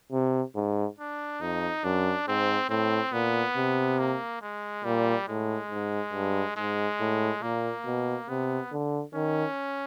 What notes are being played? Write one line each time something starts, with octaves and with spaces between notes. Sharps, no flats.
C3
G#2
D4
F2 D#4
F#2 D4
G#2 C4
A2 C4
A#2 B3
C3
A#3
G#3
A#2 G3
A2 G#3
G#2
G2
G#2 G#3
A2
A#2 A#3
B2
C3 B3
D3
D#3 C#4